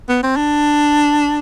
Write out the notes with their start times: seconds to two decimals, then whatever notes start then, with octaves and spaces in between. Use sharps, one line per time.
0.09 B3
0.23 C4
0.36 D4